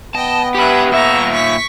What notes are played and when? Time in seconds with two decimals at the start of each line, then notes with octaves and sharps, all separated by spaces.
0.15 B3 D#5 G5 A5
0.55 G4 B4 E5 F#5
0.92 A#2 E5 A#5 C#6
1.33 C#6 B6